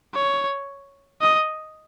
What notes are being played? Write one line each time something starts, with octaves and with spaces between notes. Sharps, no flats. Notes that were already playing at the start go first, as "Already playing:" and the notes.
C#5
D#5